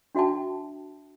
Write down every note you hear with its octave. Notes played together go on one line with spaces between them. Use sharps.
D4 F#4 E5 G5 A5